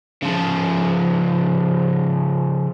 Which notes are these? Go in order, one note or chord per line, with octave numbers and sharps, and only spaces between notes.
C#3 F3